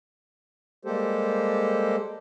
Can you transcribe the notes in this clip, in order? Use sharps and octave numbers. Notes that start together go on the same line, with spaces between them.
G3 G#3 A#3 G4 A4 C5